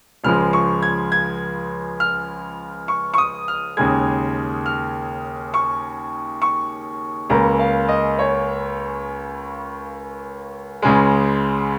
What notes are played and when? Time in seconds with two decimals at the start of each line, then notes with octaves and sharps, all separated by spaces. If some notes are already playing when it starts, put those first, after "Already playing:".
0.24 C#2 C#3 F3 G#3 F6
0.53 C#6
0.83 G#6
1.12 G#6
2.00 F6
2.88 C#6
3.14 C#6
3.18 D#6
3.48 F6
3.77 D#2 C#3 G#3 G#6
4.66 F6
5.54 C#6
6.42 C#6
7.30 C#2 C#3 A#3 A#5
7.59 F5
7.89 D#5
8.19 C#5
10.82 C#2 C#3 G#3